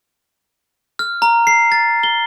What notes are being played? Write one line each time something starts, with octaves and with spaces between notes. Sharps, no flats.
F6
A#5
C7
A6
G7